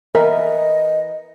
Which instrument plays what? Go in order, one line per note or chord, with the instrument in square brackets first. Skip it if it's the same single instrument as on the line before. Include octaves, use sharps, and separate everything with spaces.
[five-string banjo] E3 B3 E5 [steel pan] A#4 [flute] D#5